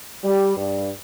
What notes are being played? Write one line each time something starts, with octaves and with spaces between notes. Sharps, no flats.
G3
G2